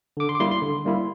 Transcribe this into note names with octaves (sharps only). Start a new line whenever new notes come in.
D3 D6
C6
D6
G3 A#3 E4 C6
C6
D3
G3 A#3 E4